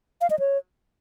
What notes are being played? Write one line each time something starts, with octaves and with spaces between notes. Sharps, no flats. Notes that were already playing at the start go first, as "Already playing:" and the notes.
F5
D#5
C#5